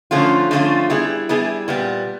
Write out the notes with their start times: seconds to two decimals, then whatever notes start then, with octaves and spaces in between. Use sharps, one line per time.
0.11 D3 F3 A3 C#4 F4
0.51 D3 F3 A3 C#4 F4
0.90 G3 B3 E4 G#4
1.29 G3 B3 E4 G#4
1.68 A#2 G3 B3